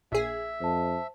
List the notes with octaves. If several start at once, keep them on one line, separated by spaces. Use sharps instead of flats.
A#1 G#4 E5
F2 C5 A5